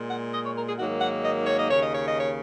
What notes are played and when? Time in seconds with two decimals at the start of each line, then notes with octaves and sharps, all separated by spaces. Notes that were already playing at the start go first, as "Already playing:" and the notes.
Already playing: A#2 G#3
0.11 F#5
0.33 D#5
0.44 C#5
0.56 A#4
0.67 G#4
0.79 G#2 D#3 F#3 A#3 F#4
1.01 F#5
1.24 D#5
1.46 C#5
1.58 D#5
1.69 D#2 C#3 A#3 C#5
1.82 D#5
1.95 C#5
2.07 D#5
2.20 C#5